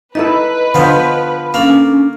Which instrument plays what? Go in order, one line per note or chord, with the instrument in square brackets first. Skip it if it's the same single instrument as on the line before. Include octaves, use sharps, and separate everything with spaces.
[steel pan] D#4 E4 A4 [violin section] B4 [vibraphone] D#5
[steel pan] D3 C5 [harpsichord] F3 B3
[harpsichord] A#3 [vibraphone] C#4 D4 A4